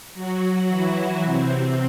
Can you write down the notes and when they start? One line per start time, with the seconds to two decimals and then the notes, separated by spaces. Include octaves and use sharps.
0.14 F#3 F#4
0.68 E3 E4
1.24 C3 C4